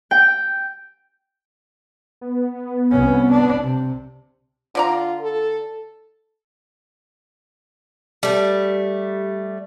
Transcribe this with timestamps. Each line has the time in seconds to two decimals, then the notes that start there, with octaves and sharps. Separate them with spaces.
0.11 G5
2.21 B3
2.91 C2 C#4
3.32 D4
3.63 C3
4.75 D3 F4 D5 A#5
5.21 A4
8.23 G3 A3